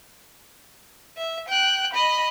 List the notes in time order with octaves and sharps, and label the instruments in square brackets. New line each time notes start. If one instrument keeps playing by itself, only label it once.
[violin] E5
G5 F#6
D#5 B5